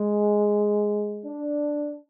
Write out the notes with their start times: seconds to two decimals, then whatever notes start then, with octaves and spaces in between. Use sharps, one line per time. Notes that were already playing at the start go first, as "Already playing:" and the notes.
Already playing: G#3
1.25 D4